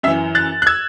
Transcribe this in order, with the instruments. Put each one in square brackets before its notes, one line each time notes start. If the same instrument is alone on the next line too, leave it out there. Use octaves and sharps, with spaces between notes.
[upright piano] F#2 E5
E3
F#6 A6
F#6
E6 G#6